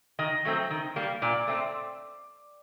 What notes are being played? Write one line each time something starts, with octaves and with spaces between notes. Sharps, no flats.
D#3 D#5
F#3 A3 C4
D#3
G3 A#3
A#2 D5
A3 C4